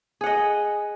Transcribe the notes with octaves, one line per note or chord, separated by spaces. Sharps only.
G#4 D#5 F#5